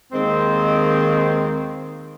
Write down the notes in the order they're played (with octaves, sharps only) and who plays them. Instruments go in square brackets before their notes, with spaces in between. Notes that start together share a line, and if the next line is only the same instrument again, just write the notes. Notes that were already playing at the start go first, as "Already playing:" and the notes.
[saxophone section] D#2 D#3 G#3 C4